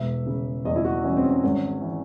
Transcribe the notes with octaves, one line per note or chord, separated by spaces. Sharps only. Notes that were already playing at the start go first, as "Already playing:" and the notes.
Already playing: E1 E5
C#3
E2 D#5
E4
F#4
E3 C#4
C4
C#4
G#1 C#4
E3